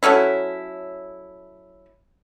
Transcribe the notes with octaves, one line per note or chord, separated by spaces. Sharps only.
F#3 A3 C#4 E4